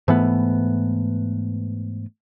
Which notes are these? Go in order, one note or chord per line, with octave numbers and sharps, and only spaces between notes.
G#2 E3 A3 B3